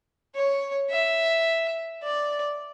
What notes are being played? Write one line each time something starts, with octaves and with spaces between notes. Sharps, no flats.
C#5
E5
D5